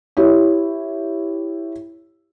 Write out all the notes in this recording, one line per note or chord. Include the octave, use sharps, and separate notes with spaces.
E4 G4 C#5